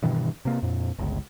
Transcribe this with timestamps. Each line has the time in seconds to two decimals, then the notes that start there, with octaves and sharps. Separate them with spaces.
0.03 G2 B2 D#3 E3
0.45 C3 A#3
0.62 F2 A#2
0.99 G1 C#2